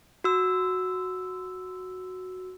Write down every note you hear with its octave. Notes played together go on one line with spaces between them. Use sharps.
F#4 E6